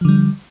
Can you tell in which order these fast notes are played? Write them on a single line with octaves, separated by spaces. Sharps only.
F3 D3 G3